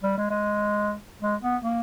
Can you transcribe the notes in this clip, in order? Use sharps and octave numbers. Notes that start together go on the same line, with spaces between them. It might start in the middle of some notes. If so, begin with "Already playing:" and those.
G3
G#3
G#3
G#3
B3
A#3